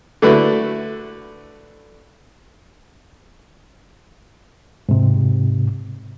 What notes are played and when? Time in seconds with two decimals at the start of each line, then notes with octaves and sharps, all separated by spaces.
0.22 D3 A3 E4 F#4 B4
4.89 G#2 C3